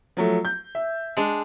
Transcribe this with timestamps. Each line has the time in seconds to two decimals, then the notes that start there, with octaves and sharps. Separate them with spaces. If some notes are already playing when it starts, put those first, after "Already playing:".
0.17 F3 F#3 A3
0.45 G6
0.75 E5
1.17 G#3 D4